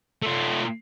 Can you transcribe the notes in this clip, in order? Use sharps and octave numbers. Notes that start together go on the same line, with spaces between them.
A3 F4